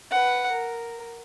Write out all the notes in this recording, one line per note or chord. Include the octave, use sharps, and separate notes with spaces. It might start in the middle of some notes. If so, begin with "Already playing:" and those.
B4 F#5
A#4